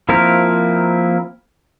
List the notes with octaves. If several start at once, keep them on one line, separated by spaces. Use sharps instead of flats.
F3 A#3 C4 E4 A#4